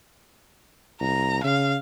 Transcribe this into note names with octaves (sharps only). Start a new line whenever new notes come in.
C2 A#5
C#3 F5